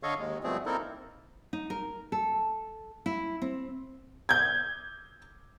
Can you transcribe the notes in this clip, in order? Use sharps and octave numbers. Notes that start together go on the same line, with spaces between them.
D3 A4 C#5 D#5 F5 C#6
D#2 G#3
B2 F3 G3 A3 C4 G#4
A#3 C4 D#4 E4 A4 A#4
D#4
A#4
A4
E4
C4
G6 G#6